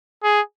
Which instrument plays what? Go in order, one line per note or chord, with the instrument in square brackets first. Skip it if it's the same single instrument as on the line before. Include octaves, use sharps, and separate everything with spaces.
[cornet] G#4